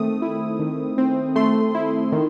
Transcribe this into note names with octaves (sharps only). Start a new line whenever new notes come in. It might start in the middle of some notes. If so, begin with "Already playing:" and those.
Already playing: D#3 A3 C4 D#6
E4
D#3
C4
A3 C6
E4
D#3